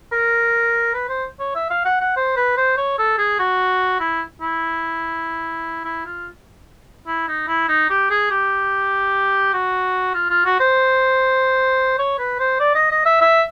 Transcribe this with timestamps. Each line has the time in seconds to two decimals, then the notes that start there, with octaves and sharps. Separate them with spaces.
0.12 A#4
0.94 B4
1.09 C5
1.39 C#5
1.55 E5
1.70 F5
1.85 F#5
2.01 F#5
2.17 C5
2.37 B4
2.57 C5
2.78 C#5
2.99 A4
3.18 G#4
3.39 F#4
4.00 E4
4.42 E4
5.85 E4
6.06 F4
7.07 E4
7.28 D#4
7.48 E4
7.69 D#4
7.90 G4
8.10 G#4
8.31 G4
9.54 F#4
10.14 F4
10.30 F4
10.45 F#4
10.60 C5
11.99 C#5
12.19 B4
12.40 C5
12.60 D5
12.75 D#5
12.91 D#5
13.06 E5
13.21 E5